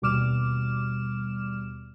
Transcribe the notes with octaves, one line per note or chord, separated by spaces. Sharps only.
D#2 B2 G3 D6 F6 E7